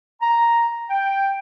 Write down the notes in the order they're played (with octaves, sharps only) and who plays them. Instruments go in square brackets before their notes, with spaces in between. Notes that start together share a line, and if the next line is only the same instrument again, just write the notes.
[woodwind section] A#5
G5